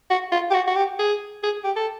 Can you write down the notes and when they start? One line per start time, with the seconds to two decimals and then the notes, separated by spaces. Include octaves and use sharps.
0.10 F#4
0.32 F4
0.50 G4
0.54 F#4
0.68 F#4
0.76 G4
0.99 G#4
1.43 G#4
1.64 G4
1.76 A4